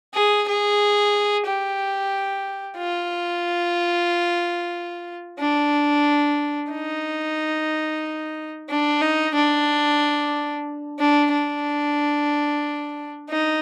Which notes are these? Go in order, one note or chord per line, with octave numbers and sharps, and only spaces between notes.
G#4
G#4
G4
F4
D4
D#4
D4
D#4
D4
D4
D4
D#4